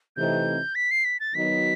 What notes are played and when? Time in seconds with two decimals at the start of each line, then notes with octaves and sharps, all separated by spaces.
0.17 C3 E3 A3 C4 D#4 G6
0.75 B6
0.91 C7
1.05 B6
1.20 A6
1.35 D#3 F#3 B3 D#4 F#4 B6